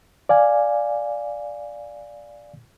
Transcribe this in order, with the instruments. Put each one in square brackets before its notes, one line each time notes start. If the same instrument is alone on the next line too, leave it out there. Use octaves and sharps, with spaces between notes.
[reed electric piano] D5 F5 G#5